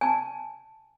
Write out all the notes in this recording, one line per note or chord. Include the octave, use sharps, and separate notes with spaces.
G#5 A5